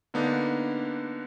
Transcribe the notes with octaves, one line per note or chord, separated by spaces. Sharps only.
D3 A#3 B3 D4 D#4